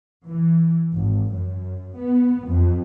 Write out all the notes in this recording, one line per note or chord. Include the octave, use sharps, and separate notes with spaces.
E3
G#1
F#2
B3
F2